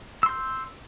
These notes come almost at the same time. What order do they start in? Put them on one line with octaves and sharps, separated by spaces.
E6 C6 G6